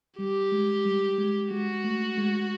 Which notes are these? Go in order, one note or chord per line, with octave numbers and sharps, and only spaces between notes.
G3 G4
G#3
G3
G#3
G#3 F#4
A3
G#3